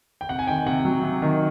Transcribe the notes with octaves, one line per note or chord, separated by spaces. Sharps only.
G5
C3 F#5
G#5
D#3 G5
C3 F#5
F#3
C3
D#3